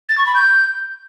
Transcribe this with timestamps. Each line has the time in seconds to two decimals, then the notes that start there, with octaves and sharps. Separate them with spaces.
0.09 A6
0.18 C#6
0.26 B5
0.35 G6